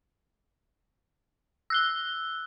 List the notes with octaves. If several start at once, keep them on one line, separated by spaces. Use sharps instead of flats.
E6 F#6 G7